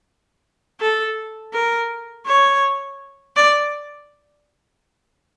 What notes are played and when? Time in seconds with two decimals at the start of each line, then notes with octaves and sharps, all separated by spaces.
0.81 A4
1.53 A#4
2.26 C#5
3.36 D5